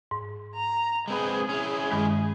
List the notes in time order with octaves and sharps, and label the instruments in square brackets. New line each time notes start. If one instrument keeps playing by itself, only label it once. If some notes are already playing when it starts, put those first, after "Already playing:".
[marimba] G#2
[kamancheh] A#5
[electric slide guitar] G#3 C4 B4 [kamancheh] G#4
[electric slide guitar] C#4 E4
[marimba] G2 D#3 G#3 [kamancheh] G#4